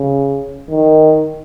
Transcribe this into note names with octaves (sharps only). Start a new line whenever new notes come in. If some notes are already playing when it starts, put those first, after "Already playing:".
Already playing: C#3
D#3